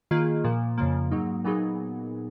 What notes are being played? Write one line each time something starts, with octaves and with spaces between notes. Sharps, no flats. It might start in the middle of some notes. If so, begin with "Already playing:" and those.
D#3 A#3 F4 G#4
A#2 F3 A#3
F2 C#3 F3 A#3
G#2 F#3 A#3 D#4
A#2 F#3 B3 D#4 G#4